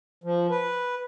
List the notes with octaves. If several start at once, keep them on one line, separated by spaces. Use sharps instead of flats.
F3
B4